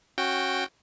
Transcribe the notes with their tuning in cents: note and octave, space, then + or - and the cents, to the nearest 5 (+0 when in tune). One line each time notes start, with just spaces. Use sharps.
C#4 -20 F#4 +0 G5 +0